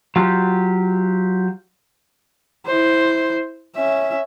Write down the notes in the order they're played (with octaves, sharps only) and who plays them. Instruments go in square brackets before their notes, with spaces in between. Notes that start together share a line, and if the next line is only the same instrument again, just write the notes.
[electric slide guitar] F#3 F4 G4
[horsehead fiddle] E4 C5
C#4 E5